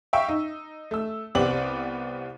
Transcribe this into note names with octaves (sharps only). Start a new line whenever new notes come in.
E5 F5 G5 C#6 E6
D#4
A3 E6
C2 B3 C4 G4 D5 F#7